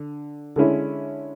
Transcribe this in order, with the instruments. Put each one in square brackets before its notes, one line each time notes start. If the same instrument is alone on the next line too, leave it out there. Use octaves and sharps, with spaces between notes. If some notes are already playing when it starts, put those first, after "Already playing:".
Already playing: [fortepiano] D3
D3 G#3 C#4 E4